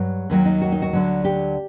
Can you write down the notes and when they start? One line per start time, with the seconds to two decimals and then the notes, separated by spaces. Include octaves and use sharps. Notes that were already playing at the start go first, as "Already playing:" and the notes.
Already playing: G2 F#3
0.30 D#2 D#3 F#3
0.45 D#4
0.62 F#4
0.72 D#4
0.82 F#4
0.93 D2 D3 F#3
1.24 G4